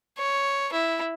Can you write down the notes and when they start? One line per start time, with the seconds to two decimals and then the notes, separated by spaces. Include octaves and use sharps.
0.18 C#5
0.73 E4